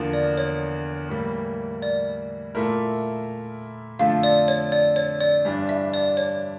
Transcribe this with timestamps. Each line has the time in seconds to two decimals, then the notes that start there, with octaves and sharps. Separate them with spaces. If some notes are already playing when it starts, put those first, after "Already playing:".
Already playing: E2 D3 F3 A#3
0.13 D5
0.38 C#5
1.09 A2 E3 G3 A#3
1.82 D5
2.55 A#2 A3 E4 A#4
3.99 F2 D3 F3 A3 F5
4.23 D5
4.48 C#5
4.72 D5
4.96 C#5
5.21 D5
5.45 G2 E3 G3 D4
5.69 E5
5.94 D5
6.17 C#5